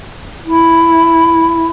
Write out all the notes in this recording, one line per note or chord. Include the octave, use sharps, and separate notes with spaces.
E4